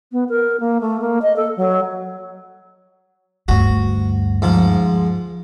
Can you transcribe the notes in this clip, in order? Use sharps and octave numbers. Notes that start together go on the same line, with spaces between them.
B3
A#4
A#3
A3
A#3
D#5
A4
F#3
D2 G2 F#4
G#2 F3